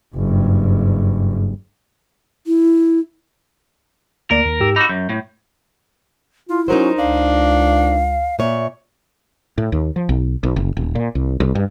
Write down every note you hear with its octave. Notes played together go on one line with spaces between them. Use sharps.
F#1 G2
E4
D2 A#3 A#4 D5
D#2
G#2 G4 E6
D#4 F#4 B5 D6 E6
F#2 G6
A2
E4 F4
F#3 C#4 D#4 A#4 C5
C#2 D4 F5
A#2 C#5 D5 E5
A2
D#2
F3
B1
B1
F#1
D#1
A#2
C2
C2
G2